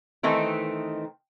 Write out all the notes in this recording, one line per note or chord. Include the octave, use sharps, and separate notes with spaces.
D#3 E3 A3 C4 D#4